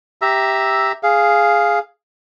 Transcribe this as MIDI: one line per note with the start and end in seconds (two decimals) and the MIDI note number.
0.22 0.92 67
0.22 0.92 76
0.22 0.92 82
0.22 0.92 88
1.03 1.79 68
1.03 1.79 77